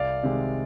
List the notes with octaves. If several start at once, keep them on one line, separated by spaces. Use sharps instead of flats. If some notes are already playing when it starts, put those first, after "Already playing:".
Already playing: C2 D5 F5
C3 D#3 G#3